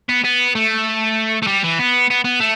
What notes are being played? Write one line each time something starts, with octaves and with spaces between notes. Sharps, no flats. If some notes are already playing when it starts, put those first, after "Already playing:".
B3
B3
A3
A3
G3
E3
B3
B3
B3
A3